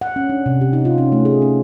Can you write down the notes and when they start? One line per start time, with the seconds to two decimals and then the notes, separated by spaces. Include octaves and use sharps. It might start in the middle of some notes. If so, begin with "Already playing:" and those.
0.01 F#5
0.16 C#4
0.29 D4
0.46 C3
0.61 G4
0.73 D#4
0.85 F4
0.98 C#4
1.12 A3
1.25 G#4
1.42 C#4